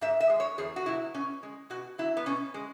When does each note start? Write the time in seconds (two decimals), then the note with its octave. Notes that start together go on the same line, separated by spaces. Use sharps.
0.01 G#2 E5
0.20 E5
0.30 G#3
0.40 C#5
0.58 E2 G#4
0.76 F#4
0.86 B2 F#3 E4
1.14 B2 C#4
1.43 G#3
1.70 B2 F#4
1.98 F#3 E4
2.17 B3
2.26 B2 C#4
2.54 G#3